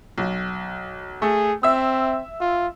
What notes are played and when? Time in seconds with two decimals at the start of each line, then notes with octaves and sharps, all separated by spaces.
0.18 B1
1.22 A3 G#4
1.63 C4 E5 E6
2.40 F4